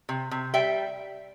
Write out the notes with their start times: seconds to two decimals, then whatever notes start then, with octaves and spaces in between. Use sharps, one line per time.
0.09 C3
0.31 C3
0.54 G3 E5 G5